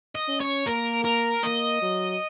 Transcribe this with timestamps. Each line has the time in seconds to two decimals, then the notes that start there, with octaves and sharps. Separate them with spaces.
0.15 D#5
0.28 C#4
0.41 C#5
0.67 A#3 A#4
1.05 A#4
1.43 A#3 D#5
1.82 F#3